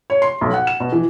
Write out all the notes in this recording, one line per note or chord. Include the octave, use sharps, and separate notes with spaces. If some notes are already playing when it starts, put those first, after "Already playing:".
C#5
C6
B1
F#5
E7
B2
E3